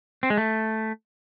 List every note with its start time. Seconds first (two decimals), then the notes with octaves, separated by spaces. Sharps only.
0.23 C4
0.30 G#3
0.37 A3